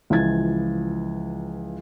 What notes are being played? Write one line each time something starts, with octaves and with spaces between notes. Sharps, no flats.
C#2 E3 F3 G#6 A6